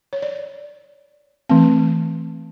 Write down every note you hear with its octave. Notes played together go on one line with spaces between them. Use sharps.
C#5
D5
E3 A3 C4